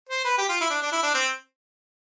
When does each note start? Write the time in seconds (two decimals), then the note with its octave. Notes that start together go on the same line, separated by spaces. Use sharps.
0.09 C5
0.25 B4
0.38 G4
0.49 F4
0.60 E4
0.70 D4
0.82 D4
0.92 E4
1.03 D4
1.14 C4